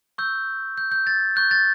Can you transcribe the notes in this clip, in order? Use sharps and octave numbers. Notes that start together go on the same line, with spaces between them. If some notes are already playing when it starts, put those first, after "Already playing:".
C#6 E6 G6
G6
G6
A6
C#6 F#6 G6
A6